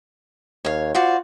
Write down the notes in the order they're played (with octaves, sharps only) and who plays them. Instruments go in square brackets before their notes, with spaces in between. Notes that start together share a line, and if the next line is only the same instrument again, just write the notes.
[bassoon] D#2 [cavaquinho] C#5 F5
[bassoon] F4 [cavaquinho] F#4 C5 D5